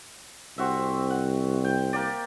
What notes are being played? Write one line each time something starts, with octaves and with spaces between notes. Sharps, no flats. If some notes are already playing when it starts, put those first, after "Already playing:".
C2 C4 F#4 E5
F#5
G5
A#3 G4 D5